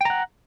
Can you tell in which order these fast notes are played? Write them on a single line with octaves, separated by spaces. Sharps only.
G5 A#5 F#5